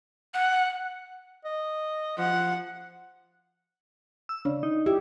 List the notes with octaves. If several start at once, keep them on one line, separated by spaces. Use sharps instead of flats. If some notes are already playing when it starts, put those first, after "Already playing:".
F#5
D#5
F3 F#5
E6
C#3 D4
D#4
E4 G4